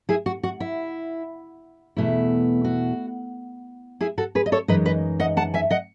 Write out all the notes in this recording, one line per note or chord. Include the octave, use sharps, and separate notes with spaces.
E4 G#4
F#4
F#4
E4
E2 B2 A3 E4
F#4
E4 G#4
F#4 A4
G#4 B4
D#5
A4 C#5
F#2 E3 G#3 D#4 B4 D#5
B4 D#5
D#5 F#5
F#5 A5
E5 G#5
D#5 F#5